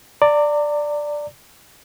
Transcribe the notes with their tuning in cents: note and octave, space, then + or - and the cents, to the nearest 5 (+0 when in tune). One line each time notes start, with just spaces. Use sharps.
D5 +5 A#5 -35